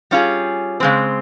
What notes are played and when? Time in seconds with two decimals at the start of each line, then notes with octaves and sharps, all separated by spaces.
0.11 G3 C#4 F4 G#4
0.80 C#3 G#3 C4